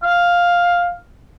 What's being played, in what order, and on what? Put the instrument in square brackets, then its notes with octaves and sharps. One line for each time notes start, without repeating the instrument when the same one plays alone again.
[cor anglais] F5